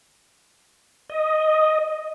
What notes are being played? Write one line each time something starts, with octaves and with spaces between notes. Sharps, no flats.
D#5